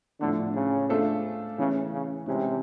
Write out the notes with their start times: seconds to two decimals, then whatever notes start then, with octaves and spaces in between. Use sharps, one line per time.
0.21 A2 D3 F3 A3 D4
0.55 C#3
0.89 A3 D4 F4 A4 C5
1.58 C#3 E3 A3 C#4
1.93 C#3
2.27 C3 E3 G#3 C#4 E4